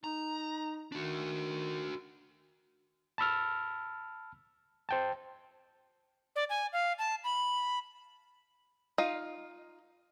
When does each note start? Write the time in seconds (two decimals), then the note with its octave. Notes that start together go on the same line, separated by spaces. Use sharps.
0.04 D#4 A#5
0.92 D#3 D4 F#4
3.18 A5 B5 E6 F6
4.89 C5 G5 A5
6.36 D5
6.50 G#5
6.73 F5
6.99 A5
7.24 B5
8.98 D#4 F4 F5